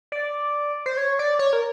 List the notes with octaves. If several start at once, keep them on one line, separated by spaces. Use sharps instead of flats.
D5
C5
C#5
D5
C#5
A#4